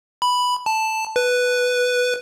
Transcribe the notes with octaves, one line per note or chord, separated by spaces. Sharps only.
B5
A5
B4